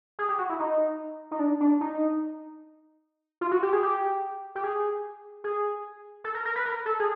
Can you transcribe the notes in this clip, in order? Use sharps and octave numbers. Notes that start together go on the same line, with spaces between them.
G#4
G4
F#4
E4
D#4
D#4
D4
D4
D#4
F4
F#4
G4
G#4
G4
G4
G#4
G#4
A4
A#4
A#4
B4
A#4
A4
G#4